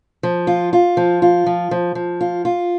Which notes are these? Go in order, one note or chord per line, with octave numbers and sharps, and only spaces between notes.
F3
F4
F4
F3
F4
F3
F3
F3
F4
F4